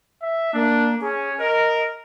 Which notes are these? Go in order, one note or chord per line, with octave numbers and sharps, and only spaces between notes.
E5
A#3 D4
C#4 G#4
A#4 D#5